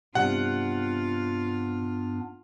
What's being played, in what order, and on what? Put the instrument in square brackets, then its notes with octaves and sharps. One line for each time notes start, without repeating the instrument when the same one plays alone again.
[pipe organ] G2 B3 D4 [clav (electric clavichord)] C3 G3 [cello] F4 [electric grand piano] F#5